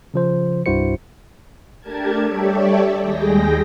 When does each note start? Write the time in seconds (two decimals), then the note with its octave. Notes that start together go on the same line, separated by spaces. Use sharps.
0.14 C#3 F3 C5
0.66 C2 G2 E4 F#4 C5 C#7
1.80 A3 D4 G4 A#4 A5 G#6
2.25 G3 G4 A4 C#5 D5 E5
3.00 D#2 G3 G#3 G#4 G5 A#6